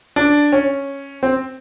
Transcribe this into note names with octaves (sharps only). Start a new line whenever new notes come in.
D4
C#4
C4